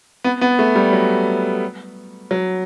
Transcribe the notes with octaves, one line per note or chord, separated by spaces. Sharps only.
B3
B3
A3
G3
F#3
F#3